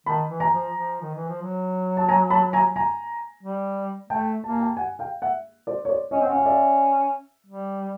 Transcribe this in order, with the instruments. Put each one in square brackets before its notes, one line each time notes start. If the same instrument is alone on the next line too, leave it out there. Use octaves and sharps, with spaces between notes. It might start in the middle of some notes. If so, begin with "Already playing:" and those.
[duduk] D#3 [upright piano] A5 B5
[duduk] E3
[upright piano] G#5 A#5
[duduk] F3
F3
D#3
E3
F3
F#3
[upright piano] A5
G#5 A#5
A5 B5
G#5 A#5
G#5 A#5
[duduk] G3
[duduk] A3 [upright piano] G5 A5
[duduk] A#3 [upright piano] A5
[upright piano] G#5
G5 A5
F#5 G#5
F5 G5
E5 F#5
C5 D5
C#5
C5 D5
[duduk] C#4 [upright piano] C#5 D#5
[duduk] C4
[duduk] C#4 [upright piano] F#5
[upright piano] F5
D5 E5
[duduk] G3